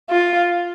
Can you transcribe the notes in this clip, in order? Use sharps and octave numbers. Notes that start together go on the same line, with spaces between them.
F4